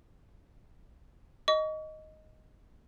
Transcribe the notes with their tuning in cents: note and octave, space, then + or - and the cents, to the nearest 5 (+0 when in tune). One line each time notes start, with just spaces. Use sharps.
D#5 +0 C#6 +40